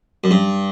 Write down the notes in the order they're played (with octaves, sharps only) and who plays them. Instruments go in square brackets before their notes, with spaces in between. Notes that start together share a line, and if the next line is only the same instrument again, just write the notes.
[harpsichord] F#2
G2